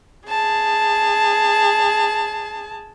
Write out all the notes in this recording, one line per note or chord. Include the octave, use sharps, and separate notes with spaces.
G#4 A5